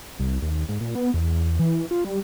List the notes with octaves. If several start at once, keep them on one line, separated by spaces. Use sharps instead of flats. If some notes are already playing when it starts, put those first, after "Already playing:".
C2
D#2
G#2
A#2
B3
E2
E3
F4
G3